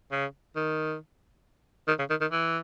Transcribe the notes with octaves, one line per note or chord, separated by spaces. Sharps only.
C#3
D#3
D#3
C#3
D#3
D#3
E3